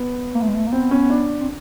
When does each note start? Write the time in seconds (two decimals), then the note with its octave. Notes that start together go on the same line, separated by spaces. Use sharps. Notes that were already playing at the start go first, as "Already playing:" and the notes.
Already playing: B3
0.35 A#3
0.41 A3
0.49 G#3
0.55 A3
0.66 A#3
0.72 B3 C4
0.91 C#4
1.10 D4
1.40 C4